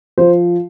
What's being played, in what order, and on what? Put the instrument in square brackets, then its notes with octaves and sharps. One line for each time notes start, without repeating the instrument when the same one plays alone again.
[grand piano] F3 C5